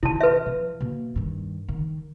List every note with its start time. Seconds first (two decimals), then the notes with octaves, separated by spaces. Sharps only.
0.03 B2 D#3 E4 A5
0.21 B4 E5
0.46 F3
0.80 B2 A#3
1.16 G2 D#3
1.68 D#3